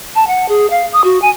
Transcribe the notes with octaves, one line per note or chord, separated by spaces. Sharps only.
A5
F#5
G#4
F5
D#6
F#4
G#5